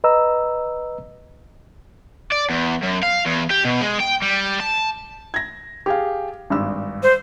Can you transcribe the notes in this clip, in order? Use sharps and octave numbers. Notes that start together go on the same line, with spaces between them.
B4 D#5 A#5 E6
D5
E2
F#2
F5
E2
G4
B2
G#3
G5
G3
A5
G#6 A#6
G4 G#4 F5
G#1 G2 E6
C5